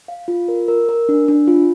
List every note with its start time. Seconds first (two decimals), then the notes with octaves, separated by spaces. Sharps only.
0.08 F5
0.28 F4
0.48 A#4
0.68 A#4
0.89 A#4
1.09 D4
1.28 D4
1.48 F4